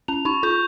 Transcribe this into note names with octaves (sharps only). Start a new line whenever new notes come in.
C#4 F7
D#4 C#6
F4 G6